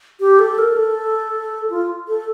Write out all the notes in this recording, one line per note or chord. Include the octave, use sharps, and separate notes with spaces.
G4
A4
A#4
A4
F4
A4